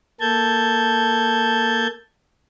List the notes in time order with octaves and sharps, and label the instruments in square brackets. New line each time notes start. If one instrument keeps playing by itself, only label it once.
[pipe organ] A#3 A4 A5 G6 G#6